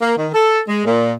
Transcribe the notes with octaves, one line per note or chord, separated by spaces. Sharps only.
A#3
D#3
A4
G#3
A#2